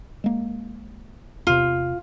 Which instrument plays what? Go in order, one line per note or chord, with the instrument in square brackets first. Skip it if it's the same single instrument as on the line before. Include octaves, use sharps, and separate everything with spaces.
[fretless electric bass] G#3 A#3
[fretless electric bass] E2 C3 [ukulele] F4